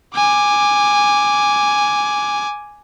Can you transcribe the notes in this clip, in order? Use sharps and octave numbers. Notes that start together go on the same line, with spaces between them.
G#5 D6